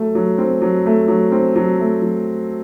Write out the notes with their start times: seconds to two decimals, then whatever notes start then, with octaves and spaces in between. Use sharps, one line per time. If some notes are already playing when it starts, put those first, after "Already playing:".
Already playing: F#3 A3
0.15 F#3
0.38 C4
0.62 F#3
0.86 A3
1.08 F#3
1.32 C4
1.56 F#3
1.79 A3
2.02 F#3